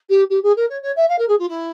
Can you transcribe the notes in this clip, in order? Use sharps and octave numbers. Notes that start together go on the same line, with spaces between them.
G4
G4
G#4
A#4
C#5
C#5
E5
F5
A#4
G#4
F4
E4